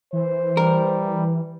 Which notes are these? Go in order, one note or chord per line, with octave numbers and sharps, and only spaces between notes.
E3 C5
G3 A#4